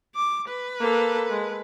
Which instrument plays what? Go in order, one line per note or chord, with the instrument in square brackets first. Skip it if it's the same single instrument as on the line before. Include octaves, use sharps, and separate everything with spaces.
[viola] D6
B4
[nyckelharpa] A#3 A4
G#3